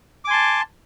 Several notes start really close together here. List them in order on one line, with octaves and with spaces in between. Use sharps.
D6 G#5 C6 A5